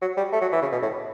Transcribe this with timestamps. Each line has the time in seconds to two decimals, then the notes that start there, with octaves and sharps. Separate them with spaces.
0.02 F#3
0.17 G3
0.32 A3
0.42 F#3
0.52 E3
0.62 C#3
0.72 B2
0.82 A2